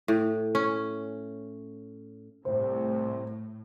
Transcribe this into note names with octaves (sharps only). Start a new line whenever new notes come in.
A2
C#4
C2 A2 C3 C5